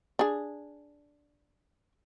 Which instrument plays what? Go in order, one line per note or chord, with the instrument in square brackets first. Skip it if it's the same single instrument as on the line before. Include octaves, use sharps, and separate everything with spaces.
[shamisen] D4 G#4